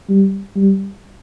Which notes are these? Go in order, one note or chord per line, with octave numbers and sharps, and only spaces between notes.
G3
G3